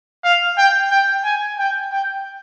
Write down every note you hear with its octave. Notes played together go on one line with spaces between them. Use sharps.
F5
G5
G5
G#5
G5
G5